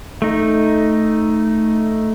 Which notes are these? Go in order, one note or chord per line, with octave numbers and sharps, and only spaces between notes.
A3 D#4